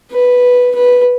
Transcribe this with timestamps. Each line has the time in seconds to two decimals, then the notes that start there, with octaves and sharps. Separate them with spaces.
0.12 B4
0.76 B4